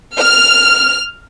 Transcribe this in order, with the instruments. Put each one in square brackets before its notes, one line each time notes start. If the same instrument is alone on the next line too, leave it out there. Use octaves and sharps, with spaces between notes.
[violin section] F6